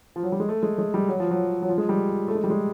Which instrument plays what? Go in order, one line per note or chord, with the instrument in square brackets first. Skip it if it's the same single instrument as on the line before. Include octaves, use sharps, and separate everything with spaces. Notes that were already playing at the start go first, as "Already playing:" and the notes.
[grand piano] F3
F#3
G3
G#3
A3
G#3
G#3
G3
F#3
F3
F#3
F#3
F3
G#3
G3
A3
G#3
G3
G#3